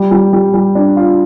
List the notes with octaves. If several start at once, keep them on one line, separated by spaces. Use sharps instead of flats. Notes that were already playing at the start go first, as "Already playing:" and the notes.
Already playing: G3
G3
G3
G3
D4
F4